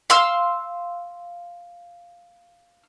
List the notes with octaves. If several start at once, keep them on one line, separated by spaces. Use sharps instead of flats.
F5 C6 E6